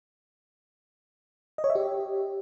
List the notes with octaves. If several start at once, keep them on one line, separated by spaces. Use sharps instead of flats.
D#5
C#5
E5
G4